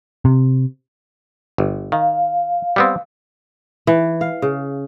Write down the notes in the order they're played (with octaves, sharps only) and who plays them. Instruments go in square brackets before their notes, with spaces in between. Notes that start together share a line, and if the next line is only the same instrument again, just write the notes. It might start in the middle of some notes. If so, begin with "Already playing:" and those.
[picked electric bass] C3
[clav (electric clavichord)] G1
[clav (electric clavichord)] D#3 [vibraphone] F5
[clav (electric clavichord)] G3 B3 C4
[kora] E3
F5
C#3